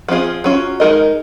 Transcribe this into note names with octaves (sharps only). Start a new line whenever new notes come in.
F3 C4 F4 G#4
F#3 C#4 F4
G#3 D#4 A#4 D#5